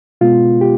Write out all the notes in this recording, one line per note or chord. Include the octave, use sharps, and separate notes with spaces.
B2 G#3 B3 F4
G4